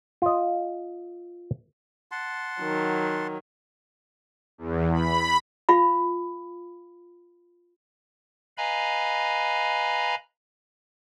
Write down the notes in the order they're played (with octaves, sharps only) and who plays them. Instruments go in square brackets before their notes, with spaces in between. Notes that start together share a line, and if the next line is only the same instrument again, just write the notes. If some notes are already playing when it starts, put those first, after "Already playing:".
[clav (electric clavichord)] F4 D#5
[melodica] F#5 A5 C6
[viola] D#3 F#3
[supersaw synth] E2
B5
[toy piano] F4 F5 B5
[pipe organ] B4 D#5 F5 G#5 A#5 B5